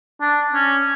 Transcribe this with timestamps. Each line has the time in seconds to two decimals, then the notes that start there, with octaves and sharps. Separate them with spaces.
0.21 D4
0.53 C#4